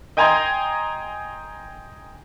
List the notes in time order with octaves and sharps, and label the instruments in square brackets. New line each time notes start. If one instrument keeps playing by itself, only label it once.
[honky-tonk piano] D#5 G5 G#5 A#5 C6 G#6